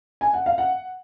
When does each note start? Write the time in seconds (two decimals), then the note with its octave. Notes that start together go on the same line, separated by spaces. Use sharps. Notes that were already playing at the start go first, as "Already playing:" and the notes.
0.21 G#5
0.34 F#5
0.46 F5
0.58 F#5